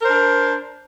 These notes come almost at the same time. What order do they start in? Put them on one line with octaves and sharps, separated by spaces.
A#4 C5 D4